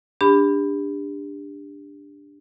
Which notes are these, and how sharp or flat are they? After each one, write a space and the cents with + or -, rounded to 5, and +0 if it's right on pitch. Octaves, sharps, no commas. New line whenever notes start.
D4 -5 G4 +35 B5 +15